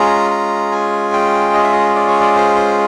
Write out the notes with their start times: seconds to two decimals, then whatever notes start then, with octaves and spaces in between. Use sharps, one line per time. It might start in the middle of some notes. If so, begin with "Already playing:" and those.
Already playing: G#3 C#4 F4 G#4 A#5
0.31 A#5
0.72 G#5
1.13 G5
1.54 D#5
1.63 E5
1.73 D#5
1.95 D5
2.08 C#5
2.20 D5
2.36 C5
2.56 C5